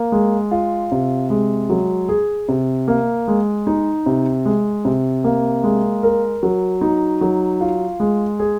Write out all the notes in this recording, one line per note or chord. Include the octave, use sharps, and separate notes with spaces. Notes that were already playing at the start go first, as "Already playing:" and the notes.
Already playing: A#3
G#3
F4
C3
G#3
F#3
G#4
C3
A#3
G#3
D#4
C3
G#3
C3
A#3
G#3
A#4
F#3
D#4
F#3
F4
G#3
G#4